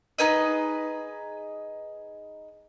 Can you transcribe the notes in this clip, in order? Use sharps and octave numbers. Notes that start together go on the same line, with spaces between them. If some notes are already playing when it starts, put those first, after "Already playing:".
D#4 G#4 B4 D#5